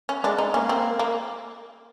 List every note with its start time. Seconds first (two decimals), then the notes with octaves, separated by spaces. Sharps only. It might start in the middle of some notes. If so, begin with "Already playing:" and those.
0.09 C#4
0.24 G#3 D4
0.38 D#4
0.54 A#3 C#4
0.69 C4
0.99 A#3